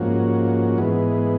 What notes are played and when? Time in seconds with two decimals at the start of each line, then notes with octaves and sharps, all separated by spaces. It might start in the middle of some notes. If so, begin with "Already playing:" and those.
Already playing: G#2 F3 A#3 C#4 F#4
0.78 G#2 E3 G#3 B3